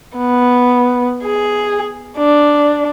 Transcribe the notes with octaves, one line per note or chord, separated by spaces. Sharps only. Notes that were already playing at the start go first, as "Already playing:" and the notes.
B3
G#4
D4